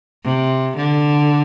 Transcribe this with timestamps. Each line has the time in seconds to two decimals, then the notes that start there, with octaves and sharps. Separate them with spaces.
0.24 C3
0.77 D3